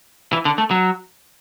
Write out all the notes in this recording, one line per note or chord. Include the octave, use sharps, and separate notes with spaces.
E3
D3
A3
F#3